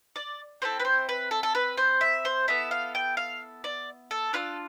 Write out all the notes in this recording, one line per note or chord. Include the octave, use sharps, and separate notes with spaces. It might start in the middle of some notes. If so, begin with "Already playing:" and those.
D5
C4 E4 A4 C5
B4
C5
B4
A4
A4
B4
C5
E5
C5
B3 E4 A4 E5
F5
G5
F5
D5
A4
D4 F4 A4 B4